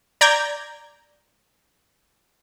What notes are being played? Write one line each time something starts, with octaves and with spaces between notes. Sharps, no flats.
D5 A#5 G6 G#6 A#6